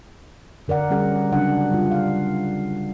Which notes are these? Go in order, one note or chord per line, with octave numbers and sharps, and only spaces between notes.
D3 A#4 D5 F#5
G3 C#4 G#4 F#5
C#3 F#3 D4 F#5
G3 F4
F5